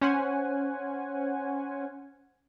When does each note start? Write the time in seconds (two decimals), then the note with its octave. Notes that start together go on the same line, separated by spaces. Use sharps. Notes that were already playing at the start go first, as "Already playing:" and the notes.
0.01 C#4 C5 F#5 G#5